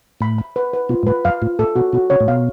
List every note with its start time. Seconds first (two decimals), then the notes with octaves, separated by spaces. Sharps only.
0.21 A2 B5
0.38 B5
0.56 B4
0.73 B4
0.89 B2 F4
1.03 G#2
1.07 A2 B4
1.25 F#2 F5
1.42 A2 F4
1.59 A2 A4
1.76 B2 F#4
1.93 B2 F#4
2.10 C#3 C#5
2.20 A2
2.28 B2 F5